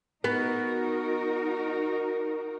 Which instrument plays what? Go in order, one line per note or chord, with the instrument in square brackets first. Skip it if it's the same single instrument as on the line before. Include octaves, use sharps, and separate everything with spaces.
[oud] B3 [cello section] D#4 F#4 A#4